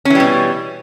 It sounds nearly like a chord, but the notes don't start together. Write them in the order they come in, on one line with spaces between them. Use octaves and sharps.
C#4 E3 G3 B2